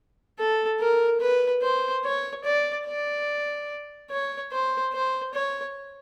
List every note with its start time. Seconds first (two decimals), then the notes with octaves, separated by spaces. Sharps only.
0.39 A4
0.80 A#4
1.20 B4
1.62 C5
2.04 C#5
2.44 D5
2.86 D5
4.11 C#5
4.52 C5
4.93 C5
5.34 C#5